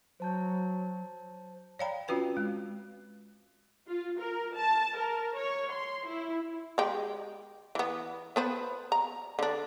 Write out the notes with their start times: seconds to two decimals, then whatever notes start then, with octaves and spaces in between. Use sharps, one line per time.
0.20 F#3 C5 A5 G6
1.79 C#5 D5 F5 G5 A#5 B5
2.08 C4 C#4 F4 F#4 B4 G5
2.37 G#3
3.88 F4
4.20 A#4
4.56 A5
4.97 A#4
5.36 C#5
5.72 C6
6.07 E4
6.78 G#3 G4
7.75 E3 B3
8.36 B3 B4 C5
8.92 A#5
9.39 D3 D4